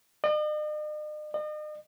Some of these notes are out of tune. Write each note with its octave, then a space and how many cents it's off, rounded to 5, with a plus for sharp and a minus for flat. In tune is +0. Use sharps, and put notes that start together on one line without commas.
D#5 -45
D#5 -40